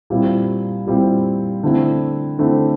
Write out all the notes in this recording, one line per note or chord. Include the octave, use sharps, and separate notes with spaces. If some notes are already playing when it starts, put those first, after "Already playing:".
A#2 G3 C4 E4
A#2 G3 C4 E4
D3 A3 C4 E4
D3 A3 C4 E4